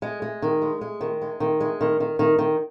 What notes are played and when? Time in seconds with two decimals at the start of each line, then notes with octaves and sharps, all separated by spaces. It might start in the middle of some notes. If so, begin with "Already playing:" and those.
0.02 G#3
0.22 G#3
0.42 D#3
0.62 G#3
0.81 G#3
1.01 D#3
1.22 G#3
1.40 D#3
1.60 G#3
1.81 D#3
2.00 D#3
2.19 D#3
2.39 D#3